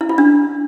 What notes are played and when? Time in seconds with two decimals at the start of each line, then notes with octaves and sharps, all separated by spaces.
0.01 E4
0.09 F4
0.18 D4